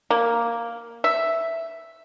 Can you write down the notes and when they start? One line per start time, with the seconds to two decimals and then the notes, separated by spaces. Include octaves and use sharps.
0.11 A#3
1.04 E5